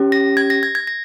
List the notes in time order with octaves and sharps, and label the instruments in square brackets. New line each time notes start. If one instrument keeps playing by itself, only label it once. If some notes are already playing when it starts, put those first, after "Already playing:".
Already playing: [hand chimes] C#4 G4
A#6
G#6
A#6
G#6
G#6
A#6